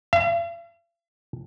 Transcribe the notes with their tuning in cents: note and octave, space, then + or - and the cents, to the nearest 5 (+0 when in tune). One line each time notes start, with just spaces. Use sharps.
F5 -45